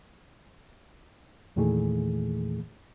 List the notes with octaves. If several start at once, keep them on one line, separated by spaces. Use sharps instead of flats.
E2 A#2 D#3 E3 A3 G#4